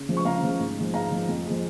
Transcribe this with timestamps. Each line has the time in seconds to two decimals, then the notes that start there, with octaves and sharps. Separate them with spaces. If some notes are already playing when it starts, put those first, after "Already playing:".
Already playing: C#3
0.09 F3 G#3
0.17 C#6
0.25 C#3 F5 A#5
0.43 F3 G#3
0.60 G#2
0.77 F3 G#3
0.94 G#2 F5 A#5
1.11 F3 G#3
1.28 F2
1.46 F3 G#3